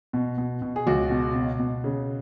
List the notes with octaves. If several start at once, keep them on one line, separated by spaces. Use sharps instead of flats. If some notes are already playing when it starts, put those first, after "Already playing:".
B2
B2
B2
G#4
C#2 F#4
B2
B2
B2
C#3